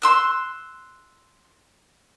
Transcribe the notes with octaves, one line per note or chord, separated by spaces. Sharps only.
C6 E6 F#6